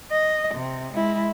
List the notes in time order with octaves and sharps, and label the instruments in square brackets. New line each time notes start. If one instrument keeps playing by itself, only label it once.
[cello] D#5
C3
G#3 E4